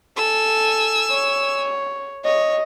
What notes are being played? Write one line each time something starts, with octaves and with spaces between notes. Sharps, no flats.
A4 G#5 E6
C#5
C#5 D#5